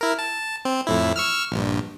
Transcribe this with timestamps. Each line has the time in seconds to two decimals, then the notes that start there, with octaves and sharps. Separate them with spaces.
0.01 E4 A#4
0.19 A5
0.65 C4
0.87 F2 A2 E4
1.16 C#6 E6 F6
1.52 A#1 G2